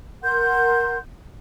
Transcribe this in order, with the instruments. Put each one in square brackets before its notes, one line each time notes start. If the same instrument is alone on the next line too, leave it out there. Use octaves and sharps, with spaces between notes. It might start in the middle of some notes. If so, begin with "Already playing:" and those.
[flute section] A#4 F#5 C6 G6